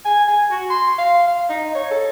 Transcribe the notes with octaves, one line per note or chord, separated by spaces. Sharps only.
G#5
G#5
F#4
C6
F5
F5
D#4
C#5
A4